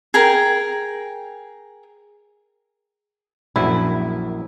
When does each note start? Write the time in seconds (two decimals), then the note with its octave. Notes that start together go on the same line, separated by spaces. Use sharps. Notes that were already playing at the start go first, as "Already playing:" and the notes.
0.14 G#4 A#4 G5
3.56 A#1 F#2 E4